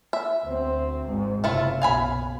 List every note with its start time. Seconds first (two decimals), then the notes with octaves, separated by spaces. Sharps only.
0.13 E5
0.45 D2 C4
1.08 G#1 G#2
1.44 F#1 C3 A3 E4 F4
1.82 B1 F5 G#5 B5